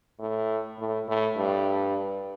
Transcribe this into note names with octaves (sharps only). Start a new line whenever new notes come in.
A2
A2
A2
G2